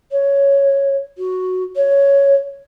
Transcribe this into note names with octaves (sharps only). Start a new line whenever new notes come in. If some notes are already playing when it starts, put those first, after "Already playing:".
C#5
F#4
C#5